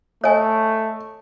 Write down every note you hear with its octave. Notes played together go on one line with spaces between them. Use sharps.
A3 C#5 D#5 G#5